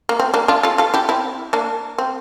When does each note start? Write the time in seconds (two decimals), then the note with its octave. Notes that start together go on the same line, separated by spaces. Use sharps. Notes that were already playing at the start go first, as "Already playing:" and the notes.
0.09 A#3
0.20 C4
0.34 A#3 D4
0.48 D4 F4
0.63 F4 A4
0.78 F4 A4
0.94 E4 G4
1.09 C4 E4
1.53 A#3 D4
1.98 C4